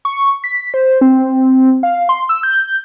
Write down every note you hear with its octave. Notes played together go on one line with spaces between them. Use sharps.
C#6
B6
C5
C4
F5
C6
E6
G6